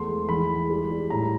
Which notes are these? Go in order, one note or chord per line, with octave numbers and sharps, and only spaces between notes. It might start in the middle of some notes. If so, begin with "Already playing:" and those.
Already playing: E2 A3 C6
G#3
E3 B5
G#3
G3
G3
A2 A#5